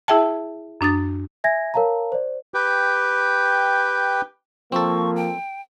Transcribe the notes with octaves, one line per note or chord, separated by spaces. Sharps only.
E4 G#4 E5 G5 A5
F#2 D4 D#6 A6
E5 G#5 G#6 A#6
A#4 C#5 F5 A5 A#5
C5 D5
G4 B4 G5
F3 A#3 C4 A4 C#6
G5